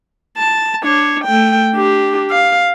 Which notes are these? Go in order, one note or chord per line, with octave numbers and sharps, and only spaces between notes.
A5
D4 C#5
A3 G5
D4 G4
F5